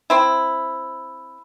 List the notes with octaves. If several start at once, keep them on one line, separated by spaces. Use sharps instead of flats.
C4 E4